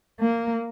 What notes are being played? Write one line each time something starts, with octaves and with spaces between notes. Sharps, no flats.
A#3